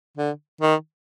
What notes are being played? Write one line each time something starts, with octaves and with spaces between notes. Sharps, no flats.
D3
D#3